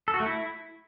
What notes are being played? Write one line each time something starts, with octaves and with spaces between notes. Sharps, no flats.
A4
F#4
A3
E4